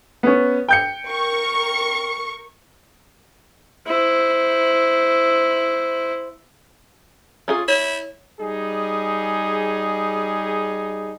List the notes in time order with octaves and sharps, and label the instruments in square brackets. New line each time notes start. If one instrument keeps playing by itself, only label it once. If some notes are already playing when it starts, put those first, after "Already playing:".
[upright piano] B3 C#4
G5 G6 C#7
[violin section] A#4 C#6
[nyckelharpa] E4 C5
[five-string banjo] C#4 F4 G#4
[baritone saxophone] E4 [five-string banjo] C#5
[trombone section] G3 D#4 G#4